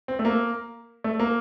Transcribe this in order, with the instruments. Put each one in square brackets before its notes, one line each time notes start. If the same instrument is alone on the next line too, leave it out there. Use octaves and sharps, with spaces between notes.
[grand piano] C4
A3
A#3
A3
A#3